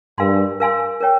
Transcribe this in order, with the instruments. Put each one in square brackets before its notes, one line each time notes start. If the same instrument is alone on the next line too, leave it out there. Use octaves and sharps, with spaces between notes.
[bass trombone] G2 [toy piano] A#4 F5 G#5 C6
[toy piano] A#4 F5 G#5 C6
A#4 C#5 G5